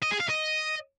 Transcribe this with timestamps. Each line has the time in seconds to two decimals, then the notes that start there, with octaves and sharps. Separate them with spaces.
0.02 D#5
0.11 G#4
0.20 F5
0.28 D#5